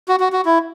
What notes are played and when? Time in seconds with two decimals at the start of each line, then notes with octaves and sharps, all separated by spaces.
0.08 F#4
0.20 F#4
0.33 F#4
0.45 E4